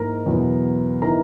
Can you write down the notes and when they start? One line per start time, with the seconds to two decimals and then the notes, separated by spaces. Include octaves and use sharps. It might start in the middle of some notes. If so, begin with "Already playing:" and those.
Already playing: G#2 E3 A#3 D#4 A#4 A#5
0.26 E2 B2 F#3 B3
1.02 C#3 E3 B3 D#4 A#4 A#5